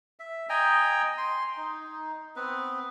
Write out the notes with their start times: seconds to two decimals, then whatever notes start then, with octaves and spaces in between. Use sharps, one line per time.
0.20 E5
0.49 D#5 G5 G#5 A#5
1.18 C6
1.57 D#4
2.36 B3 C4 B4